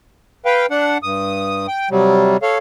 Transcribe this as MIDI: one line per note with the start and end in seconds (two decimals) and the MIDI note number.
0.45 0.66 71
0.45 0.66 77
0.45 0.66 79
0.70 0.98 62
0.70 0.98 78
1.03 1.67 43
1.03 1.67 87
1.68 1.89 79
1.91 2.37 48
1.91 2.37 54
1.91 2.37 55
2.42 2.58 69
2.42 2.58 73
2.42 2.58 77